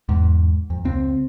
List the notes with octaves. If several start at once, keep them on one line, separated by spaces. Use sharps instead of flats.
E2 G#2
F2
C#2 C4